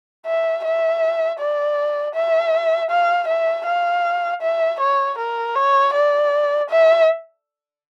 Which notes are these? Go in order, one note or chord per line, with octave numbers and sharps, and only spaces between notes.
E5
E5
D5
E5
F5
E5
F5
E5
C#5
A#4
C#5
D5
E5